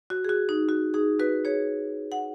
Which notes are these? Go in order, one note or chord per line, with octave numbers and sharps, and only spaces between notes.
F#4
G#4
F#4
D#4
F#4
D#4 G#4
F#4 B4
G#4 C#5
F#5